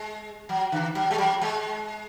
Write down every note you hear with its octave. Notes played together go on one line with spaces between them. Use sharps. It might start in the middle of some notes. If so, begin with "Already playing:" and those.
Already playing: G#3
F#3
D3
F#3
G#3
F#3
G#3